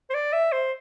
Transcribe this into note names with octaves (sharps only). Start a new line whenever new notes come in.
C5
D5
E5
C5